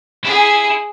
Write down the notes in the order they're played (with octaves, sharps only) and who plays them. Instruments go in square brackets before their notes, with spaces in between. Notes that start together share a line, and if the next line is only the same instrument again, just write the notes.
[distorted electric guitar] E4 [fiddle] G#4